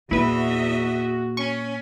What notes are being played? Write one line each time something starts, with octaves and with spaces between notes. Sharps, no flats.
E2 A#2 E4 F#4 B4 D#5 E5
C#4 C#6